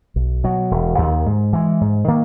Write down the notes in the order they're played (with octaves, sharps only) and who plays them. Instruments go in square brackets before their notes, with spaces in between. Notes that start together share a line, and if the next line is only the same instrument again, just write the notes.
[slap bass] B1
B2 F#3
E1
D#2 D#3
G#2
E3 G#3
G#2
D#3 A#3